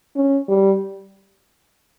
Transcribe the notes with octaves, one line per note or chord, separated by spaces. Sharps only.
C#4
G3